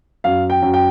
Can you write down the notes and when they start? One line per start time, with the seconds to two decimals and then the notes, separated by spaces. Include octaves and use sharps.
0.24 F#2 F5
0.50 G5
0.62 F#2
0.74 G5